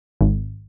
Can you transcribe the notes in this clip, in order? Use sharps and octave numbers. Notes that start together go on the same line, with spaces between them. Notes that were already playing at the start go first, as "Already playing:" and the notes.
G#1